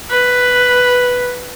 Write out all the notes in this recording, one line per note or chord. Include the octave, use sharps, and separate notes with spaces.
B4